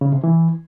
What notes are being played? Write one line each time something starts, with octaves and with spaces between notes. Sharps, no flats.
C#3
C3
E3